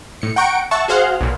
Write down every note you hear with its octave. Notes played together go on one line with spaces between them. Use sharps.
A2 C#7
F#5 G5 A#5 C#6 C#7 D7
E5 F#5 A5 C#6
F#4 G#4 C5 F5 F#5
B1 A#2